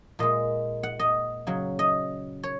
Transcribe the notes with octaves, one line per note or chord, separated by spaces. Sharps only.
A#2 G#3 D#5
F#5
D#5
C#3 F#3
D#5
C#5